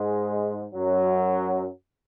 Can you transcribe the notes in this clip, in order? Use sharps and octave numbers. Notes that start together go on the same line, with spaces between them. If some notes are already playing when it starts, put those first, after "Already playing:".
Already playing: G#2 G#3
F#2 F#3